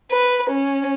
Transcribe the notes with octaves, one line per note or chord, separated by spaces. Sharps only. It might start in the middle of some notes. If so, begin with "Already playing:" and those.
B4
C#4